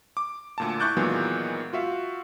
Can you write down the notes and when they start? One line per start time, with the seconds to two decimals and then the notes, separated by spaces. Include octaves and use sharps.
0.17 D6
0.58 D2 A#2 A5
0.80 E4 C#6 D6 F#6 G6 A6
0.97 A#2 D#3 E3 F#3 G#3 B3
1.73 F4 F#4 E5 F5